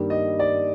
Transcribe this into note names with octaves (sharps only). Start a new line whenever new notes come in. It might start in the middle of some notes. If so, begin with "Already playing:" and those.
Already playing: G2 D#3 G3 A#3
D#5
D5